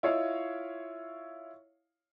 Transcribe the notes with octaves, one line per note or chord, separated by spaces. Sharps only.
E4 F4 C#5 D#5 F5